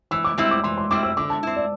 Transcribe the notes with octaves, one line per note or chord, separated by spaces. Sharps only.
E3 E6
D6
G3 C4 E4 E6
D6
E3 C6
C6
G3 C4 E4 D6
E6
D3 D6
A5
C4 E4
D5